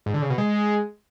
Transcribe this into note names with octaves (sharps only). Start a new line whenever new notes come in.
G#2
D3
C#3
B2
G#3